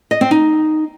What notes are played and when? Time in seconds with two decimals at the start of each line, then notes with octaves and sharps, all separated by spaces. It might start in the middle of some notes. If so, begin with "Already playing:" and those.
0.11 D#5
0.21 C4
0.31 D#4